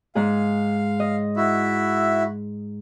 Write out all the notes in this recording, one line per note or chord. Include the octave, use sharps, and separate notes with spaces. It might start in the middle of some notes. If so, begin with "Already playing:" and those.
G#2 G#4 F5
D#5
E4 F#4 E5